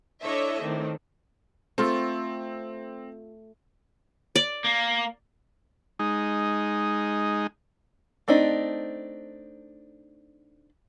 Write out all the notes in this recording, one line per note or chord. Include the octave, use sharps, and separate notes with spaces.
D4 E4 A4 C#5 D#5 E5
A2 D#3 C4 D4
A3 C4 F4 A4
D5
A#3
G#3 D#4
A3 C4 D4 D#4